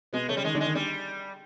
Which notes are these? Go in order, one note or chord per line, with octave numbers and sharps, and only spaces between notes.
B2 G#3 B3
C#3 A3 C#4
G3
D#3 G#3 D#4
D3 D4
D#3 G#3 D#4
G3 D4